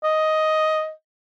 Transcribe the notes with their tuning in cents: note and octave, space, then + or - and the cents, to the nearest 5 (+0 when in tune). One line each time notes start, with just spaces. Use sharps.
D#5 +10